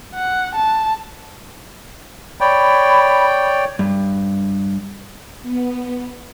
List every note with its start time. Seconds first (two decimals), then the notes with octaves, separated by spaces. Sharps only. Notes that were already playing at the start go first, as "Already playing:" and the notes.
0.15 F#5
0.55 A5
2.41 C#5 D5 G5 B5
3.79 G2
5.43 B3